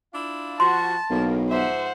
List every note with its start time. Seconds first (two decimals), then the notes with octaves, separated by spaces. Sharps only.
0.13 D4 E4 F4
0.60 F3 F#4 A5 C6
1.10 B1 A2 C#3 A#3
1.50 G#2 F3 C5 E5 F#5